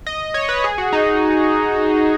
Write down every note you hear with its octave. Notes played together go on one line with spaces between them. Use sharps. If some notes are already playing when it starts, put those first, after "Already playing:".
D#5
C#5
B4
G#4
F#4
D#4